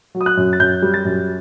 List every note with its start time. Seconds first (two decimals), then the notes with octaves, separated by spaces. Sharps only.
0.15 F#3
0.21 D#6
0.26 F#6
0.37 F#2
0.53 A6
0.60 F#2 G6
0.82 G3
0.94 A6
1.05 F#2